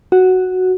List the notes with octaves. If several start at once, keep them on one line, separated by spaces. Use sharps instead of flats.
F#4